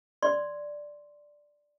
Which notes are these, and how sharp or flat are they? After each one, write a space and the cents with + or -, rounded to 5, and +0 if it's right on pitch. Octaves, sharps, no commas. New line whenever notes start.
D5 +0 C6 +0